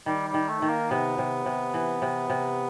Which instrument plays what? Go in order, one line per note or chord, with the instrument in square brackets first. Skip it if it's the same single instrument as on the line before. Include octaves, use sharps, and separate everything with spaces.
[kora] D#3 [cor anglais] G3
[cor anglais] G3
[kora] D#3
[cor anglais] A3
[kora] D#3
[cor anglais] A#3
[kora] C3 [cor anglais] B3
[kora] C3
C3
E3
C3
C3